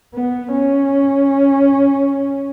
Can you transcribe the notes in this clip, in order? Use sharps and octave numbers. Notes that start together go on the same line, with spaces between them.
B3
C#4